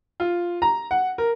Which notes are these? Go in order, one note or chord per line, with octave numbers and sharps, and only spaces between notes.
F4
A#5
F#5
A#4